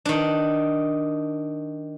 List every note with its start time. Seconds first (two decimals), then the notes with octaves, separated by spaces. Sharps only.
0.05 D#3 D4